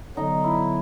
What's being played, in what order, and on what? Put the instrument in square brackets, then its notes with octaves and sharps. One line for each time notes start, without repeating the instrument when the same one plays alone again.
[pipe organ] D3 F#3 B3 [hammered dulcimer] D#4
[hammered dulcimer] E4